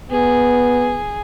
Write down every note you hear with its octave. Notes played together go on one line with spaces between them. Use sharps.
B3 G#4